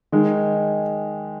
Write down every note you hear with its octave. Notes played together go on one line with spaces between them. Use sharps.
D#3 G#3 D#4